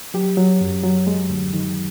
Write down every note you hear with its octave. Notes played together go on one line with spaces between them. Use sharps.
F#3 G4
F#3
F#2
F#3
G#3
D2
D#3